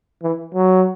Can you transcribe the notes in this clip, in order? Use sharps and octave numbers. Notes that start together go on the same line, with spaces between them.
E3
F#3